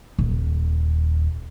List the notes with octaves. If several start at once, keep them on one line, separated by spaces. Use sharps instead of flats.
D#1